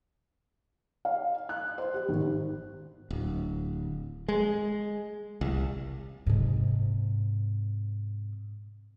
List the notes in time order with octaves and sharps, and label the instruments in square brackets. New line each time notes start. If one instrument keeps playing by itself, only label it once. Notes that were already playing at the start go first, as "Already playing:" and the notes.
[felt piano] F5
F#6
C5
G4
G#1
[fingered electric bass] D1
G#3
C2
[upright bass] G#2 C3